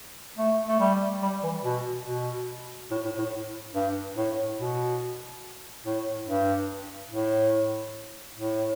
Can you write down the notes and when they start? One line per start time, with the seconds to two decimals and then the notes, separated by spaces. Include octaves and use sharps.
0.38 A3
0.68 A3
0.80 G3
1.22 G3
1.43 E3
1.64 B2
2.07 B2
2.91 A2
3.05 A2
3.19 A2
3.75 G2
4.17 A2
4.59 B2
5.85 A2
6.28 G2
7.12 A2
8.38 A2